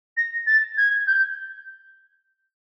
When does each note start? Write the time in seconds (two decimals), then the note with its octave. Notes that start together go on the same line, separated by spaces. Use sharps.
0.17 A#6
0.47 A6
0.77 G#6
1.07 G6